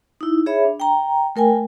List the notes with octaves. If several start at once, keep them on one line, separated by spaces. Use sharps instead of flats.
D#4 E4
G#4 C#5 E5 B5
D4
G5 A#5
A3 A#4 G5 G#5